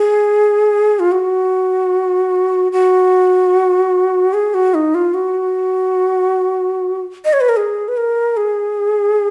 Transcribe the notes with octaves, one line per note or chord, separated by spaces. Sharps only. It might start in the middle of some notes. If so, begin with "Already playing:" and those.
Already playing: G#4
F4
F#4
F#4
G#4
F#4
D#4
F4
F#4
D#5
C#5
B4
A#4
G#4
B4
A#4
G#4